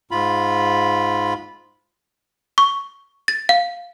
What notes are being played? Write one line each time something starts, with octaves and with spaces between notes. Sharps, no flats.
G#2 F4 B5
C#6
A6
F5